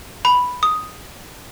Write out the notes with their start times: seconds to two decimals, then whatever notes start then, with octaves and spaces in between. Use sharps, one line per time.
0.25 B5
0.63 D#6